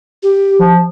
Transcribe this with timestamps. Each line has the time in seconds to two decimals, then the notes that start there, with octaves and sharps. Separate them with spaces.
0.23 G4
0.59 F3